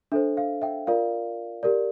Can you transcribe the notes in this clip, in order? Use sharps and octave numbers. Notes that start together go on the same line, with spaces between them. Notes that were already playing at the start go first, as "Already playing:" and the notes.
D4 A4 C5 E5
F5
E5 G5
F4 A#4 D5 F5
G4 A#4 D5